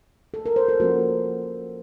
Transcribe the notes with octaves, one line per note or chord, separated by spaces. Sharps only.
A4
A#4
C5
A4
F3 A#3 C#4 F#4